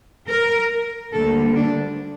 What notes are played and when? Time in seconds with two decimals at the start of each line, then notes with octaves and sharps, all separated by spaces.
0.29 A#4
1.13 D2 D3 G3 A#3 A4
1.55 D4